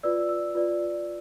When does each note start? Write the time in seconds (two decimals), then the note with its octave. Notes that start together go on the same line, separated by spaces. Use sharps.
0.03 F4 B4 D5 E6
0.29 E6
0.55 F4 B4 D5